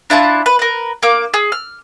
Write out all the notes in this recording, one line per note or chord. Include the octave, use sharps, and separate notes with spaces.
D4 E4 F4 A5
B4
A#4 B4
A#3 D6
G#4
F6